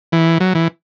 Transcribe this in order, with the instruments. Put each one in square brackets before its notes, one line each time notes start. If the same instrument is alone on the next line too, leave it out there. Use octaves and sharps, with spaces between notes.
[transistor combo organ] E3
F#3
E3